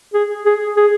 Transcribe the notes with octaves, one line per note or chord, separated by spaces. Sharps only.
G#4
G#4
G#4